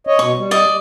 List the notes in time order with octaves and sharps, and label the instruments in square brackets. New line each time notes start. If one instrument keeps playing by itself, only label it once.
[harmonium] C#5 D#5
[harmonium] B2 [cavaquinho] C#6
[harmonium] G3
[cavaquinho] D5 D#5